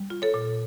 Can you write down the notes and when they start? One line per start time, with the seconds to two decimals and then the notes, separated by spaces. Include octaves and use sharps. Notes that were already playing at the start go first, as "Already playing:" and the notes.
Already playing: G3
0.10 F4
0.22 A4 C#5
0.34 A#2